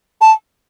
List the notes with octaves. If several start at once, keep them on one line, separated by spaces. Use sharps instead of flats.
A5